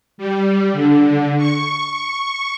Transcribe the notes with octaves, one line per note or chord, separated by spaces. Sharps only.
G3
D3
C#6